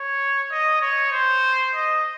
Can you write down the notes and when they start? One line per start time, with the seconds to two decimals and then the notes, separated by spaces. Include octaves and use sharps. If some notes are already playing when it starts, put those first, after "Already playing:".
Already playing: C#5
0.51 D#5
0.82 C#5
1.12 C5
1.75 D#5